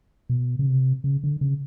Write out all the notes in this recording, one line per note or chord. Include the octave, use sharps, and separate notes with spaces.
B2
C#3
C3
C#3
D3
C#3